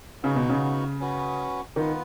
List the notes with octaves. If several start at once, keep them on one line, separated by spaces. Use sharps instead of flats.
C#3 B3 D#4 F#4
B2
C#3
C#4 F#4 B4
D#3 B3 F4 B4